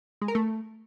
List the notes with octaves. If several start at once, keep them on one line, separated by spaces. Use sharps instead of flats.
G#3
A#4
A3